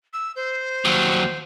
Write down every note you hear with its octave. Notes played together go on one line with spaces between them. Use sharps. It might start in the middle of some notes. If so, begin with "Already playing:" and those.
E6
C5
D#2 F#3